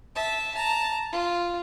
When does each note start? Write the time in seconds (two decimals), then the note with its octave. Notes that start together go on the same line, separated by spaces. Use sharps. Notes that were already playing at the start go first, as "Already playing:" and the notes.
0.15 E5 A5
0.55 A5 A#5
1.12 F4